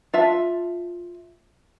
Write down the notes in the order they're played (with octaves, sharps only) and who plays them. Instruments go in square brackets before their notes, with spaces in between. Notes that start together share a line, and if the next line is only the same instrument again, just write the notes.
[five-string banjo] F4 E5 A5